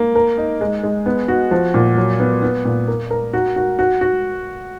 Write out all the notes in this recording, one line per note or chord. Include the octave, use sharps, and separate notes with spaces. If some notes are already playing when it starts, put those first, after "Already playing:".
Already playing: A#3
A#4
D#4
G#3
G#3
B3
F#4
F3
A#2
F#3
B3
B3
A#2
A#4
A#4
F#4
F#4
F#4
F#4